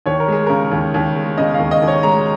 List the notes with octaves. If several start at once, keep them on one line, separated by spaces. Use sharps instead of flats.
D#2 C#5
A#4
G#3 G#4
C#3 A#4
D#2
D#2
G#3
C#3 D#5
D#2 F5
D#5
D#2
C#5
G#3 A#5